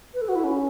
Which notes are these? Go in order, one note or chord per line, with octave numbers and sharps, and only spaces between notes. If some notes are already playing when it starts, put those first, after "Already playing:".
B4
A4
F#4
E4
C#4